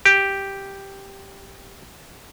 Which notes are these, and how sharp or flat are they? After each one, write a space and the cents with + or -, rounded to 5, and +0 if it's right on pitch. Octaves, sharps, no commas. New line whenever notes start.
G4 +0